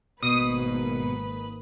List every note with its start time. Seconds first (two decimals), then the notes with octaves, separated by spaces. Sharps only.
0.23 G#1 B2 A#3 B4 D#6